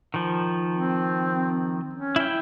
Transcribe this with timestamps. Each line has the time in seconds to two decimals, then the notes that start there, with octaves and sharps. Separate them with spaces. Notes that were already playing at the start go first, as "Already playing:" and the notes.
0.14 D#3 F3
0.75 C4
1.94 C#4
2.16 E4 G5